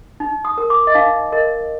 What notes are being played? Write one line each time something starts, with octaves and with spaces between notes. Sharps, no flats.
D#4
D#6
A#4
D6
D#5
D#4 F5
A#4 D#5